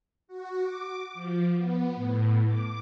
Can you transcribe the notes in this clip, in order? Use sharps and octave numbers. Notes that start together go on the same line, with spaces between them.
F#4
D6
F3
B3
A2
D6